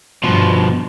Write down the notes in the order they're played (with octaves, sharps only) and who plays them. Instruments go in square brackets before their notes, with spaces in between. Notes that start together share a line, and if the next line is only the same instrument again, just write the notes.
[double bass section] G2 [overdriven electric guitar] B2 F3